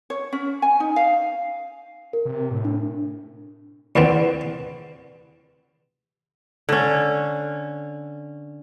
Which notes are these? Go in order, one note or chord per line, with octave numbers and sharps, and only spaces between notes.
C#5
C#4
G#5
D#4
F5
A#4
C3
A2
D4
E2 D3 B3 C4
D3 C#4